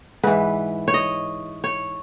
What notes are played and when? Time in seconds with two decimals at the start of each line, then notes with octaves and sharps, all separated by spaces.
0.23 G#2 E3 B4
0.88 C#5
0.94 D#5
1.64 C#5